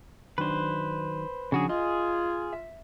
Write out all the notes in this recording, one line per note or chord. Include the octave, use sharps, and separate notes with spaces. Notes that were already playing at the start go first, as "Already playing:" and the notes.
D#3 F#3 D4 B4 C5
C#3 F3 D4 F#4 G#4
F4 G#4 D#5
E5